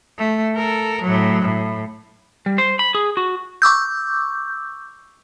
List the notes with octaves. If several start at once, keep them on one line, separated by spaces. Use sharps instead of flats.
A3
A4 A#4
A2 F#3
A2
G3
C5
B5
G#4
F#4
C#6 D6 E6 G6